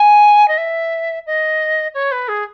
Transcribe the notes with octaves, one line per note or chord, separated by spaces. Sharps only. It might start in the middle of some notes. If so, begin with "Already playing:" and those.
Already playing: G#5
D#5
E5
D#5
C#5
B4
G#4